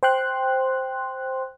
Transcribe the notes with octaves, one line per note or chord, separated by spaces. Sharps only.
C5 G5 C6 F#6